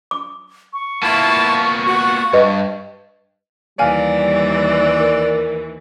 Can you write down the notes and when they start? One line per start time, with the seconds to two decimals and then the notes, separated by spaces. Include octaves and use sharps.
0.11 D6
0.73 C#6
1.03 A#3 B3 E4 F4 A5
1.87 F#4
2.33 G2 G4 B4 D#5
3.79 D#2 E3 G3 D5 F5 G#5 F6
5.00 A#4